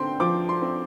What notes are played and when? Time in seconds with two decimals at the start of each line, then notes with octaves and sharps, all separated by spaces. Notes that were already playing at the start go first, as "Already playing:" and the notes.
Already playing: D3 C4 G5 C6
0.20 F3 D6
0.49 C6
0.62 C4